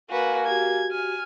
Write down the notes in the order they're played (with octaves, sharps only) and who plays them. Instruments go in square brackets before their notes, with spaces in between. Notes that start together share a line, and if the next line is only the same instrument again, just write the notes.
[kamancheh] A#3 G#5 [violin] F#4 B4 [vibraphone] F5
[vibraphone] F#4 G4 [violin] G#6
[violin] G#5 [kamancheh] F6